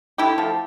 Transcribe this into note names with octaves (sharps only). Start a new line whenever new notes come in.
D3 E4 G4
F3 A3